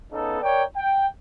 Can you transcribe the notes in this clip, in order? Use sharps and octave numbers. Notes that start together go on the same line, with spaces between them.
C#3 B3 D#4 A4
A#4 C#5 D5 G5
G5